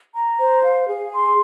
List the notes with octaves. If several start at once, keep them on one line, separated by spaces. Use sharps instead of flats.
A#5
C5
F5
G#4
C6